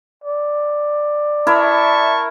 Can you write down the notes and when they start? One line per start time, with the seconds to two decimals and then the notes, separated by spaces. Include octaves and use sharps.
0.24 D5
1.47 E4 A#4 E5 A5 C#6